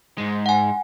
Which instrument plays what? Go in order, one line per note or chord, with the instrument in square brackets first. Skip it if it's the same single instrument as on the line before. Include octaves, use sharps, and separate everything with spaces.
[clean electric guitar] G#2 G#3
[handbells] F#5 G#5